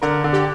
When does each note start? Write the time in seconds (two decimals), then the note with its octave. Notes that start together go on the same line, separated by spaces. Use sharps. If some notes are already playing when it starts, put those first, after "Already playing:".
0.02 D3 A#4
0.24 D3
0.33 G4